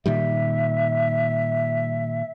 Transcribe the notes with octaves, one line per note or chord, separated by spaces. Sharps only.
A#2 D#3 G3 E5